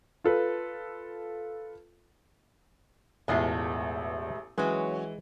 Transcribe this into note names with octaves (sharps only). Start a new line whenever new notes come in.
F4 A4 B4
E1 A1 E2 G#3 A3 E4 F4
E3 F#3 G#3 C#4